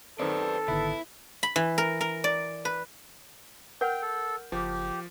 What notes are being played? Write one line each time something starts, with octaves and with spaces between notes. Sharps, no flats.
D#3 C4 A4 B4 D5
G#1 D3 D#3 B3 E4
B5
E3
A#4
A#4
D5
B4
A#4 F#5 G5 F6 G6
A4
F#1 F3 G4 G#4